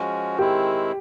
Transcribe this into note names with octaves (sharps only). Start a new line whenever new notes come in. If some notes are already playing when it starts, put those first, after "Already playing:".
Already playing: F3 G#3 C#4 F#4
D#3 G#3 C4 E4 G4